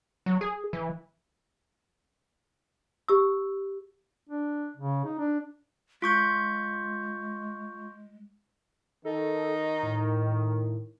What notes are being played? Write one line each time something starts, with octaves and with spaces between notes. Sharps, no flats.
F#3
G#4
E3
G4 E6
D4
C#3
D#4
D4
G#3 F4 C#6 G6
D#3 D#4 A4
A2